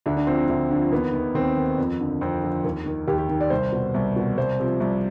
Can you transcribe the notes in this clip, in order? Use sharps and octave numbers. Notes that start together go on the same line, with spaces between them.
D2 D4
D4
D3 F3 C4
D2
D3 F3
D#2 B3
D#3
D#2 C4
D#3
F2
D3 F3
F2 C4
D3 F3
D#2
D#3
D#2 G4
G4
D#3
D5
C2 C5
B2
C2
B2
C2 C5
C3 F3
C2